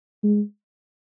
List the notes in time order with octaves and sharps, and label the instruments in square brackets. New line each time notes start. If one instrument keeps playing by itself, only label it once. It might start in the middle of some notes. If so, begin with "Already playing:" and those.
[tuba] G#3